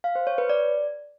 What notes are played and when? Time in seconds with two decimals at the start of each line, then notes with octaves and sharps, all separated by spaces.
0.04 F5
0.15 C5
0.27 C#5
0.38 B4
0.49 D5